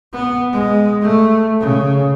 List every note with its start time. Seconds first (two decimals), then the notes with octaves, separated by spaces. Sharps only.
0.13 B3
0.52 G#3
1.02 A3
1.60 C#3